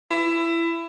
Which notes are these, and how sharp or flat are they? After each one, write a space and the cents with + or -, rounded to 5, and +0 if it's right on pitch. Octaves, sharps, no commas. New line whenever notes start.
E4 +20